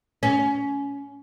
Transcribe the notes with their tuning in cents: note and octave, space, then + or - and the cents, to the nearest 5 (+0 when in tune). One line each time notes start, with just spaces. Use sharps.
C#4 +20